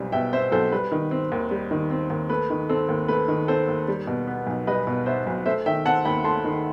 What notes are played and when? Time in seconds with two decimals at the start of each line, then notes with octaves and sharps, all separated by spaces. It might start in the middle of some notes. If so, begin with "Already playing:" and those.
Already playing: B1 B2 G3 C4
0.12 B2 E5 G5
0.32 C4 C5 E5
0.52 B1 A4 C5
0.72 G3 B4
0.92 D#3
1.11 C4
1.32 D#2
1.51 G3
1.71 D#3
1.90 C4
2.10 D#2
2.30 A3 B4
2.50 D#3
2.69 C4 A4
2.89 D#2
3.08 A3 B4
3.28 D#3
3.48 C4 A4 C5
3.69 D#2
3.88 G3
4.07 B2
4.27 B3
4.47 B1
4.67 G3 B4 D#5
4.87 B2
5.06 B3 C5 E5
5.27 B1
5.46 A3 C5 E5
5.66 D#3 E5 G5
5.85 C4 F#5 A5
6.05 D#2 G5 B5
6.24 A3 A5 C6
6.44 D#3